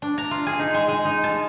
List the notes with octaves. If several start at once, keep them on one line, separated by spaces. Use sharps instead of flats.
D4
A#5
F4
G#4
D#4
G#3
G#3
D#4
A5